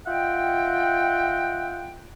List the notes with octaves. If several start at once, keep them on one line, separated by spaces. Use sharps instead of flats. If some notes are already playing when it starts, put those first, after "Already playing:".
F4 D#5 E5 F#5 G5